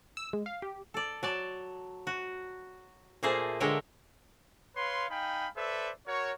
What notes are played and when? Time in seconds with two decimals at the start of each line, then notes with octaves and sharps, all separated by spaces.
0.17 E6
0.33 G#3
0.46 F5
0.62 G4
0.94 A4 D5
1.23 F#3 D5 A5
2.07 F#4
3.23 A#2 A3 A#3 G#4 C5
3.60 D3 G#3 A#4 C#5 E5 G5
4.77 B4 C#5 F5 C6
5.10 D#4 F5 G5 G#5 B5
5.57 A4 B4 C5 D5 E5
6.07 F#4 A#4 C#5